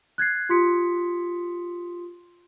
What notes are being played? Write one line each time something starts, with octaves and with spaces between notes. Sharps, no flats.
F#6 G#6 A6 C7
F4 G4 C6 D#6 B6 C#7